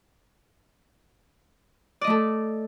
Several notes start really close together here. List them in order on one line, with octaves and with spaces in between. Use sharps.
D5 D#5 A3 A4